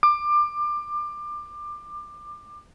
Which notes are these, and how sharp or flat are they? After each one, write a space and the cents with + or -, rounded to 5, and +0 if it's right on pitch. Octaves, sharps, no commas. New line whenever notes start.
D6 +25